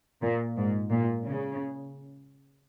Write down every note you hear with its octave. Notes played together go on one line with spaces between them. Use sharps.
A#2
G#2
A#2
C#3